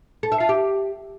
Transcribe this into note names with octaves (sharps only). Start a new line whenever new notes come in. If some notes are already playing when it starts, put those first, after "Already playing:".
A4
E5
F4
G4